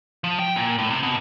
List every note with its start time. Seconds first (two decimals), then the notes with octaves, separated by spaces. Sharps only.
0.24 F3
0.39 G5
0.56 A#2
0.79 A2
0.90 C3
1.03 B2